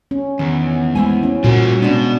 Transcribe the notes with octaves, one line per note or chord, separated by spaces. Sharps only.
C#4
E2 D#3
G#3 A3 E4 C5 G#5
C#4
A#2 G3 A#3 F4 F#4
B2 G#3 C#4 D4